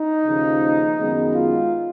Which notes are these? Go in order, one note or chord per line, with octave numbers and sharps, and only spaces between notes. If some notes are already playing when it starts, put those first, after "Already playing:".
Already playing: D#4
D#2 C#3 F3
F#2 D#3 G#3 B3
F4